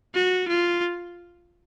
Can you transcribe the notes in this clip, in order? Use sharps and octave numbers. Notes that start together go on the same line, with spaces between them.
F#4
F4